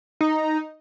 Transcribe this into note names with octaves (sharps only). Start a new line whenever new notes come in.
D#4